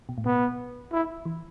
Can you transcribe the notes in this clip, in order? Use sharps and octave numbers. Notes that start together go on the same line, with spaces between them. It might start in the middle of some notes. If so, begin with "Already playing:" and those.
B2
A2
B2 B3
E4
E3